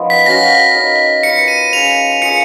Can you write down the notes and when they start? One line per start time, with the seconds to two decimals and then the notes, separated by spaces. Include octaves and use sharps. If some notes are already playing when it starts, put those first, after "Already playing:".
Already playing: F3 B3 C#4 D#4 F4 A#4
0.10 B6
0.26 C#4 F#4 C#5 F5 A#6
0.75 D#4 A#4 C#5 F5
1.23 A#3 F4 B4 D#5 C#7
1.48 D#7
1.72 C#4 F4 G#4 C#5 F7
2.21 A#3 F4 G#4 C#7